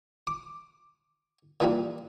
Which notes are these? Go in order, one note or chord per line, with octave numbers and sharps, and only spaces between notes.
D6
A#2 E3 F3 G3 A#3